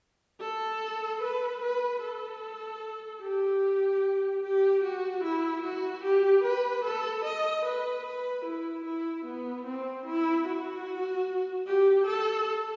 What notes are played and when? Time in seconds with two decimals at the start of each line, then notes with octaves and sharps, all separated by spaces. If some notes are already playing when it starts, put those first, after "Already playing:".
0.40 A4
1.22 B4
1.62 B4
2.02 A4
3.22 G4
4.43 G4
4.83 F#4
5.24 E4
5.63 F#4
6.04 G4
6.43 B4
6.84 A4
7.24 D#5
7.65 B4
8.04 B4
8.45 E4
8.85 E4
9.25 B3
9.66 C4
10.06 E4
10.45 F#4
11.66 G4
12.06 A4